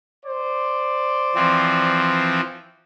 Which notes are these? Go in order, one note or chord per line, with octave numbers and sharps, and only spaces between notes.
C5 D5
E3 F3 C4